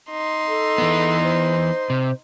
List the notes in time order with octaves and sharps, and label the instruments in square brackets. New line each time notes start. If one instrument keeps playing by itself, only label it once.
[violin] D#4 C6
[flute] A4
[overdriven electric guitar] E3 B3
[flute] C5
[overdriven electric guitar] C3